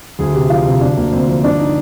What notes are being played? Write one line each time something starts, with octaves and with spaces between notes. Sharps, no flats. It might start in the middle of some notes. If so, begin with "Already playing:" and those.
D2 G#4
C3 G4
F3 F4
C3
D2 D4
D2 A#3
D2 C4
F3
G1 D4
D#4